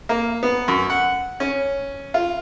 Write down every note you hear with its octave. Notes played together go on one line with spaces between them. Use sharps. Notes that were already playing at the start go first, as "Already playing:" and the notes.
A#3
B3
F#2
F#5
C#4
F4